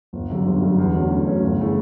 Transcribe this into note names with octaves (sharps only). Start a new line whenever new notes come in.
G1
F#2 D3 G3
G1
F#2 D3 G3
E2
D3 F#3 A3 C#4
E2
D3 F#3 A3 C#4
G1
C#3 E3 A3